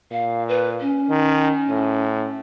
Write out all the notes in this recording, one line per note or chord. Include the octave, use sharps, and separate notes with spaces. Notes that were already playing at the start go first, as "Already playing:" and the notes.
A#2 F5
B4
C#4
D#3
A2